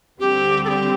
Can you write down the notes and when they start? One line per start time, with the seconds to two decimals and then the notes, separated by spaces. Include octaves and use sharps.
0.19 D2 D3 G3 C4 G4
0.65 A4
0.68 G4